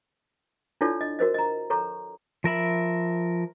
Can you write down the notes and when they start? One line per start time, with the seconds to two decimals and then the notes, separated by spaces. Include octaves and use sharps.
0.81 D4 E4 F4 A4 C#5 D5
1.01 D#5
1.19 F#4 A#4 C5 D#5
1.34 D#5 A#5
1.70 A4 C#5 A#5 C#6
2.44 F3 A#4 E5 B5